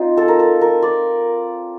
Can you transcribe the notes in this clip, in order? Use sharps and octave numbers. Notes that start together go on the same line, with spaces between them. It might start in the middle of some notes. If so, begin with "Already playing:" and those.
Already playing: C4 D#4 F4
A4
A#4
A4
A#4
D5